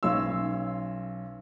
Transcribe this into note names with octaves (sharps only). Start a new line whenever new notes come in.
B1 C#4 C#5 F5 C6 E6